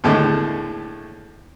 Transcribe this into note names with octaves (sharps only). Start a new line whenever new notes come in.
D#2 A2 D3 G#3 A3